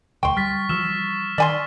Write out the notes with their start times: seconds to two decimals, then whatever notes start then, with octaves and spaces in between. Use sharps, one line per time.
0.23 E1 D2 G5 C6 C#6
0.37 G3 F6 A6 B6
0.69 E3 F3 G3 E6 F6 E7
1.38 D#3 D5 G#5 C6